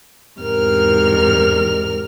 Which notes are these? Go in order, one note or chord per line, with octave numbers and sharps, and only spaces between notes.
E2 G#2 C3 A#4 F6